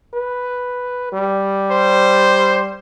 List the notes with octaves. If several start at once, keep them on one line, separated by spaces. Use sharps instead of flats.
B4
G3
C5